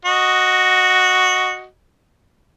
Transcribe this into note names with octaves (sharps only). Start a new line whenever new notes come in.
F#4 D#5